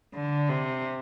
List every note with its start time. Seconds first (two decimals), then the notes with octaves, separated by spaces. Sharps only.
0.15 D3
0.49 C3